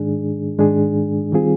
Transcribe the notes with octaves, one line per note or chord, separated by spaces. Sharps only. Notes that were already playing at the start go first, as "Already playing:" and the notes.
Already playing: G#2 D#3 G#3 D4 G#4
G#2 D#3 G#3 D4 G#4
D#3 G3 C4 F4 G#4